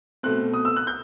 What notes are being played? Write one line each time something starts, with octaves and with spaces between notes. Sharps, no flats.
B2 A3 C4 F#6
D#6
E6
F#6
G6